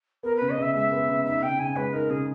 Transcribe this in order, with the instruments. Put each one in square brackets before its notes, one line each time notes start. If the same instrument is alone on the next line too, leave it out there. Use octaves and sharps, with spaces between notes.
[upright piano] B3 [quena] A#4
[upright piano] C#3 [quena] B4
[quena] D#5
[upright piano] C#3 [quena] E5
[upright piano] G#3 [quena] E5
[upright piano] B3
C#3
[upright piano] D#4 [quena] E5
[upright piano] C#3 [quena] G5
[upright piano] C#3 [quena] G#5
[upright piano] G#3 [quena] B4
[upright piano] D#4 [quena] A#4
[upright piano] C#3 [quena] G#4